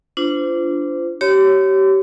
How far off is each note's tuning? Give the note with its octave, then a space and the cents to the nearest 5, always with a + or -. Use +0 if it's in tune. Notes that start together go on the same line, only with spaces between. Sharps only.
D4 -15 F4 -30 C5 -30
G4 -30 C#5 +0 C6 -45